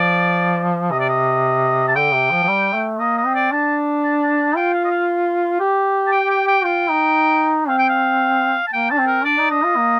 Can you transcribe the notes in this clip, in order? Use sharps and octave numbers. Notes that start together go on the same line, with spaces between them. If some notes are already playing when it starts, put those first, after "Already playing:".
Already playing: F3 D5
C3 D#5
D5
D#5
A5
D3 G5
C3
F3
F3
G3
A3
A#3 D#5
D#5
C4
D5
D4 A5
A5
A5
F4 G5
F5
D#5
F5
G4
A5
G5
G5
G5
F4 G5
D#4
C4 F5
G5
F5
A5
A#3 G5
D4 A5
C4
A#4
D4 D5
D#4
D4 D#5
F4
A#3